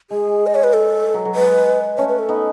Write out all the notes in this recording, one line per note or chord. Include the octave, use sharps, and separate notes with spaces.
G#3 G#4
D#5
C#5
B4
A4
F#3
F#3
G#3 B4
A3 C#4 C#5
B4
A4
B3 D#4